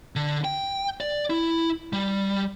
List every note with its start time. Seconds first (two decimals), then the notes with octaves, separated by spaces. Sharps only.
0.16 D3
0.44 G5
1.00 D5
1.30 E4
1.93 G3